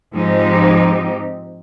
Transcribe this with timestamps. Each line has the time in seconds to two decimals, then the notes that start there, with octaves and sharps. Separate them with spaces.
0.14 G#2 F3 G#3 C4 D#4 G4